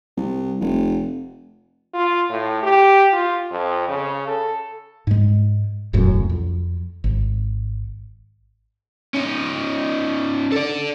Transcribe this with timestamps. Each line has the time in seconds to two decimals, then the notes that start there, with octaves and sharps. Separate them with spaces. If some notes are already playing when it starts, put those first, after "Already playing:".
0.17 C2
0.60 F1
1.94 F4
2.29 A2
2.63 G4
3.13 F4
3.51 F2
3.89 C#3
4.27 A4
5.07 G#2 G#3
5.93 E1 C2 F#2 A2
6.29 F2
7.04 G#1
9.14 C#4 D#4
10.52 A4 D5